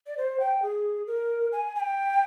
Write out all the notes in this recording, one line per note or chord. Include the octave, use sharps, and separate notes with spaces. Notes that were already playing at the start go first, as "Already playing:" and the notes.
D5
C5
G5
G#4
A#4
G#5
G#5
G5